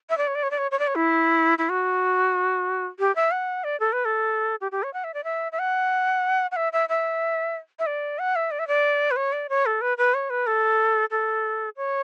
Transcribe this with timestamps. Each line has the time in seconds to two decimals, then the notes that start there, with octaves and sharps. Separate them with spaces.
0.09 E5
0.17 D5
0.27 C#5
0.35 D5
0.43 C#5
0.51 D5
0.58 C#5
0.71 C#5
0.79 D5
0.87 C#5
0.96 E4
1.58 E4
1.69 F#4
2.99 G4
3.15 E5
3.31 F#5
3.64 D5
3.80 A4
3.92 B4
4.05 A4
4.61 G4
4.72 G4
4.83 C#5
4.93 F#5
5.04 E5
5.14 D5
5.24 E5
5.52 E5
5.59 F#5
6.51 F#5
6.56 E5
6.73 E5
6.89 E5
7.79 E5
7.86 D5
8.19 F#5
8.35 E5
8.51 D5
8.59 E5
8.67 D5
9.11 B4
9.16 C#5
9.32 D5
9.49 C#5
9.66 A4
9.81 B4
9.98 B4
10.14 C#5
10.30 B4
10.47 A4
11.11 A4
11.76 C#5